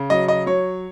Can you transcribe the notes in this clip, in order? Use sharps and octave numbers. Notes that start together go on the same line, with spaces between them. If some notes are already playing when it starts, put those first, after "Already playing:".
Already playing: C#3
F#3 D#5
D#5
F#3 C#5